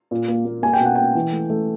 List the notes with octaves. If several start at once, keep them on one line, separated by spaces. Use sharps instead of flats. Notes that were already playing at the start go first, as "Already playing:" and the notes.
A#2
A#3
A#3
A#3 G#5
G5
B2
F#5
A#3 G5
E3
A3
A3